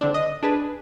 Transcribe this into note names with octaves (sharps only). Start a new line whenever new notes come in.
D3 C4 D4
D#5
D4 G#4 B4